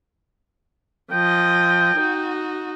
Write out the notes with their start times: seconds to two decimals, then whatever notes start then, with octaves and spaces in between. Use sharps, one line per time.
1.12 F3 D#5 G5
1.97 D#4 F#4